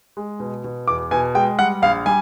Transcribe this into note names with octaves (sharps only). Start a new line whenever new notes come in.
G#3
B2
B2
E2 D6
B2 G#5
G#3 G5
G3 F#5
A#1 F5
G3 G#5